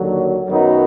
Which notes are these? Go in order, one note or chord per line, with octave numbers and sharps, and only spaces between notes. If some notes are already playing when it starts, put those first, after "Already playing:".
Already playing: D#2 D3 F#3
F#2 D#3 F#3 B3 D#4